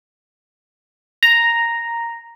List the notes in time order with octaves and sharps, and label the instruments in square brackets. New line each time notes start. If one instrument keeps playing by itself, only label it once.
[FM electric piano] A#5